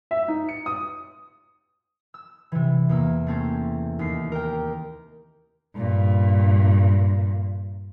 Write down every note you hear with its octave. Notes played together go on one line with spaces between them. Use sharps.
E5
D#4
C#7
D#6
E6
C3 E3
E2 A#3 E6
A3 C4 C#4
D#2 C7
A#4 G5
G2 A#2